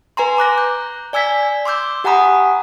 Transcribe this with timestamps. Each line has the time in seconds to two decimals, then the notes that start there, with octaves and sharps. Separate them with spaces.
0.17 B4 G#5 A#5 C6
0.37 A#5 D6 F#6 A#6
0.58 G6
1.13 D5 G#5 E6 G#6 B6
1.65 C6 D6 E6 G6
2.04 G4 F#5 G#5 A#5 B5 D#6